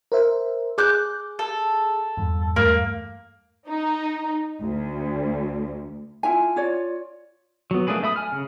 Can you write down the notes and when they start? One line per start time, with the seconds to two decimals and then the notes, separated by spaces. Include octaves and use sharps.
0.12 A#4 C5 E5
0.78 G#4 D6 F#6 G6
1.39 A4
2.17 E2 G2
2.56 E2 G2 A3 A#3
3.68 D#4
4.62 D2
6.23 E4 F4 G#5
6.56 F4 C#5 D5
7.71 F#3 B3
7.87 A3 A#3 D4 G#4 B4
8.03 A3 E5 B5 D#6
8.16 G#5 F6
8.32 C#3